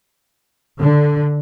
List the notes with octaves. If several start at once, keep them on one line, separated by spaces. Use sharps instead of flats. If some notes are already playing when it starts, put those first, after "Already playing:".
D3